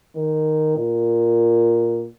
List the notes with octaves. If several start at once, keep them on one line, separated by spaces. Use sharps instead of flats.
D#3
A#2